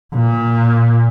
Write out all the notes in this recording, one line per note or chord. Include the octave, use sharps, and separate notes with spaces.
A#2